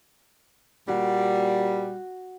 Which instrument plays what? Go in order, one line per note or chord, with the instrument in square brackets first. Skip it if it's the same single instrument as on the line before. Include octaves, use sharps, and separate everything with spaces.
[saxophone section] A#2 G3 [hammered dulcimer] F#4